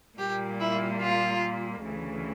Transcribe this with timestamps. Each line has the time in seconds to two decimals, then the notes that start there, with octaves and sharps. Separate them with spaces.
0.18 A#2 G3 A#3 G4
0.60 E4
1.01 F4
1.83 D2 C#3 E3